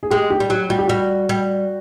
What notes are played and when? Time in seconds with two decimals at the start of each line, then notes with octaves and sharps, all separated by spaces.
0.03 G#4
0.10 G#3 G4
0.30 G4
0.40 G3
0.50 F#3 G4
0.69 G3 F#4
0.79 G4
0.87 G3 F#4
1.29 G3